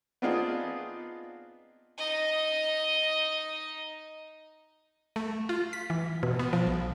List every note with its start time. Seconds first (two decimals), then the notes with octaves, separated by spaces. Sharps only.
0.22 B3 C4 D4 D#4 F4 G#4
1.98 D#4 D#5
5.16 A3
5.49 F4
5.73 B6
5.90 E3
6.23 B2
6.39 B3
6.53 F3
6.67 B1